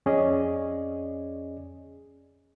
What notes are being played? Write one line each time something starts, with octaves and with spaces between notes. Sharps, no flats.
F2 C#4 G#4 D5 D#5